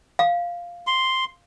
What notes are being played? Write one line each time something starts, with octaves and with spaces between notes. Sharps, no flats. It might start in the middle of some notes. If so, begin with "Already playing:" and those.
F5
C6